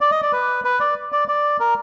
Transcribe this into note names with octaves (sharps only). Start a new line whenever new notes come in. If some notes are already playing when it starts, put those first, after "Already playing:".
D5
D#5
D5
B4
B4
D5
D5
D5
A#4